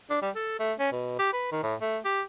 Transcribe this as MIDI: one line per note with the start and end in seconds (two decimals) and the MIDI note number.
0.10 0.19 62
0.22 0.30 55
0.35 0.57 69
0.60 0.73 57
0.79 0.90 61
0.92 1.15 47
1.19 1.32 67
1.33 1.50 71
1.52 1.62 51
1.63 1.75 45
1.81 1.98 57
2.05 2.22 67